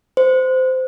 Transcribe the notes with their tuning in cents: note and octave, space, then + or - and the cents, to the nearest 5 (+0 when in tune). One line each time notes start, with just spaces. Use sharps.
C5 -20